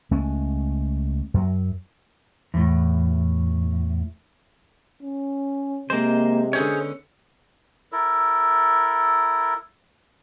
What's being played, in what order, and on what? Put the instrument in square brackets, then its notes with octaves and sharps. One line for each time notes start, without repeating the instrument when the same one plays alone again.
[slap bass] C#2 G#3 A3 C#4
F#2 F#3
[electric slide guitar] E2 A2
[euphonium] C#4
[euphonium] C3 [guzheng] G#3 [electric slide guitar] A#3 C5
[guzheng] D3 B3 C#4 [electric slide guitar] G#4 C5 C#5
[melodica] E4 A4 A#4